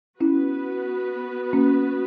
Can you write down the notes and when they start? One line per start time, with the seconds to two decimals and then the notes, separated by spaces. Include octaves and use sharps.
0.20 B3 C#4 E4 F#4 B4
1.53 A#3 C#4